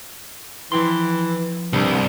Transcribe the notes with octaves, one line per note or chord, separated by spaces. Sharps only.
E3 F3 G5 C6
C2 G2